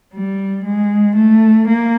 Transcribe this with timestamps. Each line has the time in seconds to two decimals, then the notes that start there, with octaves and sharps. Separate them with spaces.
0.13 G3
0.64 G#3
1.15 A3
1.66 A#3